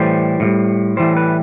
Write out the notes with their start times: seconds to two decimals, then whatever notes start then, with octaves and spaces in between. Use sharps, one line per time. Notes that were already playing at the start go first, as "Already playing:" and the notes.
Already playing: A2 E3 G3 C5
0.40 A2 E3
0.45 G3
0.97 A2 E3 G3 C5
1.17 B4